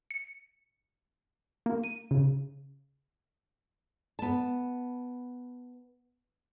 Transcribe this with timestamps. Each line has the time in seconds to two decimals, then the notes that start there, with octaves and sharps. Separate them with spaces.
0.11 C#7
1.66 A#3
1.83 D#7
2.11 C#3
4.19 B3 A5